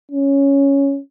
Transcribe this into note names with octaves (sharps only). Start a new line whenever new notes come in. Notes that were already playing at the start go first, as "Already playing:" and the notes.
C#4